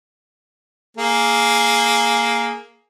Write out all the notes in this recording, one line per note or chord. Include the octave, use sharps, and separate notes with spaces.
A#3 G#4